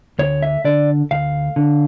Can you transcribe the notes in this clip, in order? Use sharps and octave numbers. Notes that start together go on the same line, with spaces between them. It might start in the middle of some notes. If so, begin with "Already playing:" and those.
D2 C#5
E5
D3 D5
D2 F5
D3